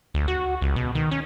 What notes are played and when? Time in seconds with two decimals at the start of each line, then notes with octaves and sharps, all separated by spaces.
0.14 D2
0.28 F#4
0.61 C#2
0.76 B2
0.95 D#3
1.11 C#4